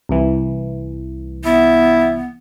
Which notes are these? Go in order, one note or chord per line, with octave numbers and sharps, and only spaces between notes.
C2 E3
B3 E4